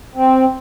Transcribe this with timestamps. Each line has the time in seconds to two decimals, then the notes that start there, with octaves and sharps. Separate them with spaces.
0.15 C4